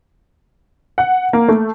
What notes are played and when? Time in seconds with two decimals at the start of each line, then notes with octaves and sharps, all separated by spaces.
0.98 F#5
1.33 A#3
1.48 A3